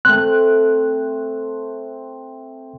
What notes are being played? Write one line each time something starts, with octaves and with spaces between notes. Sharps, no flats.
A3 C4 F#6